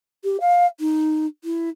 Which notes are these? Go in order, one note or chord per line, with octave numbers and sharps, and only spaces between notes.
G4
F5
D#4
E4